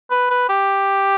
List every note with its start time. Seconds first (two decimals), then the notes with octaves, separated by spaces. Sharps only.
0.11 B4
0.30 B4
0.49 G4